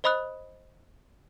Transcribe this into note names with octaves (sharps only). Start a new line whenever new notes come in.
C5 D#5 B5 D#6 F#6